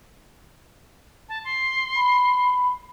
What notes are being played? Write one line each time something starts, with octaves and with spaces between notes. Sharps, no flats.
A5
C6
B5